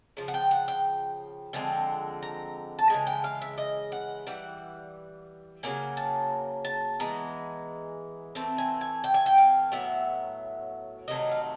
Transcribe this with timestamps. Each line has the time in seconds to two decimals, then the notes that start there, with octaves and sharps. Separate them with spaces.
0.17 C#3 F3
0.28 F#5
0.34 G5
0.51 F#5
0.68 G5
1.53 D3 F3 G#3 C4
2.23 A#5
2.79 A5
2.90 C#3 E3 G#3 G#5
3.07 G5
3.24 F5
3.42 E5
3.58 D#5
3.92 F#5
4.27 E3 G3 F#5
5.63 C#3 F#3 A#3 G#5
5.97 A5
6.65 A5
7.00 E3 G#3 B3 A#5
8.35 E3 A3 C4 A5
8.58 G#5
8.81 G#5
9.04 G5
9.14 G#5
9.26 G5
9.38 F5
9.72 A2 F#3 B3 E5
11.08 C3 D#3 F#3 A3 D#5
11.31 F5